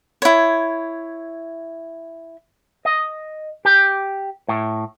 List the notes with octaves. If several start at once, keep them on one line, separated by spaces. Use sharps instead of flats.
E4 C#5
D#5
G4
A2